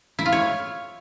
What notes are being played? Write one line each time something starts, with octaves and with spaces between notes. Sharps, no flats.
E4
F4
C#5